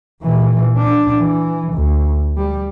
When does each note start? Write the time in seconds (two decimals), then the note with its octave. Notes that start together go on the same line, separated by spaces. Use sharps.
0.21 A#2 E3
0.78 D4
1.17 E3
1.73 D2
2.37 G3